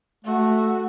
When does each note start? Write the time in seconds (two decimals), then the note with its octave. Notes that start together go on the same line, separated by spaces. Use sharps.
0.25 A3 F#4